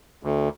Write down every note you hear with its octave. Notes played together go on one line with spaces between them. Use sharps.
D2